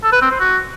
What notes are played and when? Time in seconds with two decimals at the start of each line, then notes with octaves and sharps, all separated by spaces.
0.03 A4
0.12 B4
0.22 C4
0.31 C5
0.40 F#4